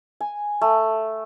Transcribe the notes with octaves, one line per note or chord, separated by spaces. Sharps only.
G#5
A3